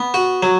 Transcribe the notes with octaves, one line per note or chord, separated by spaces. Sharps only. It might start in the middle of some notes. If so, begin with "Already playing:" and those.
Already playing: B3
F#4
F#3